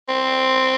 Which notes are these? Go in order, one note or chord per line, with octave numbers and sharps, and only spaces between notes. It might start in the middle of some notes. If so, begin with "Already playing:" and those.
C4